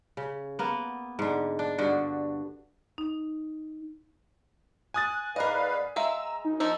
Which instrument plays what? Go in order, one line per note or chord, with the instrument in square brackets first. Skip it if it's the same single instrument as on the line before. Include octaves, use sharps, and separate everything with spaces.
[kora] C#3
A#3 B3
G#2 D3
D4
G2 D3 F#4
[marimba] D#4
[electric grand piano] G#5 D#6 A6 [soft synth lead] F#6
[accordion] G#2 B4 F5 [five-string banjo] A#4 D#5 [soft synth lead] D5
[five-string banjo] G#3 E5 F5 [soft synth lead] A#5 [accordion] E6
[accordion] F#2 [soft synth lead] D#4
[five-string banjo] F3 A#3 D#4 [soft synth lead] E6